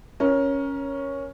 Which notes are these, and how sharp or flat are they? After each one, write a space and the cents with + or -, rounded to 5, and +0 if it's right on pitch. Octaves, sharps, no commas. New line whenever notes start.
C#4 +0 A#4 +20